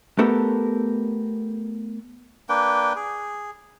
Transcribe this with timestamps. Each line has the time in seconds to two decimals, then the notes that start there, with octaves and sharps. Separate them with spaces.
0.19 A3 B3 G4 A4 A#4
2.49 A#3 D4 B4 G5
2.96 G#4